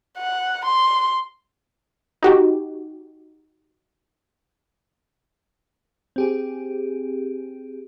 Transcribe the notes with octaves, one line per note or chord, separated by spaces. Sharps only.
F#5
C6
D#4 F#4 G4
C4 G4 G#4